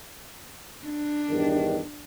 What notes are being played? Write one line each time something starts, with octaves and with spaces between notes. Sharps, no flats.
D4
E2 G2 D#3